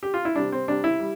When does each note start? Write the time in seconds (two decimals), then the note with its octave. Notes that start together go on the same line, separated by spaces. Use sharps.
0.03 G4
0.14 F4
0.25 E4
0.35 C3 G3 D4
0.52 C4
0.68 C3 G3 D4
0.84 E4
1.00 G3